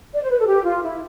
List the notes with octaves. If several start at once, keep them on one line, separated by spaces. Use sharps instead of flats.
D5
C5
B4
A4
G4
F4
E4